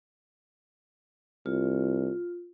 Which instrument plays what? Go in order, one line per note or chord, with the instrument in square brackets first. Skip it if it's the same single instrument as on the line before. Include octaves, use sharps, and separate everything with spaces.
[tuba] C2 [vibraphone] F4